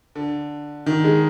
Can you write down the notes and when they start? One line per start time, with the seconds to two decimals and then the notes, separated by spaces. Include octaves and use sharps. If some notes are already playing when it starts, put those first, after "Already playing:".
0.15 D3
0.86 D#3
1.04 G#3